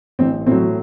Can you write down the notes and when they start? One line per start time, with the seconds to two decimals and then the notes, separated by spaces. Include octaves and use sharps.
0.19 A1 C4
0.46 A2 C4
0.51 F#3